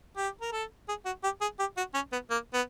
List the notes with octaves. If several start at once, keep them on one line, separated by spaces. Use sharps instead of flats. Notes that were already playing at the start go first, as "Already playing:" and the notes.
G4
A#4
A4
G#4
F#4
G4
G#4
G4
F#4
C#4
B3
A#3
B3